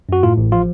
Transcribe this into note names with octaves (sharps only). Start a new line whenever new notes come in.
F#2 F#4
A2 F4
A1
F3 F4